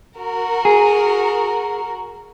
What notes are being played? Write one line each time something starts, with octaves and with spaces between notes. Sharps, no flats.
F#4 A#4
G#4